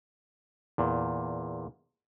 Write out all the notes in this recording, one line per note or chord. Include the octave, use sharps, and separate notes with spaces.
E2 A#2